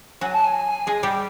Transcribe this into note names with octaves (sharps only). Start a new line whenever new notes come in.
F#3 F#4 G#5
A5
G#5
G#3 G#4
G3 G4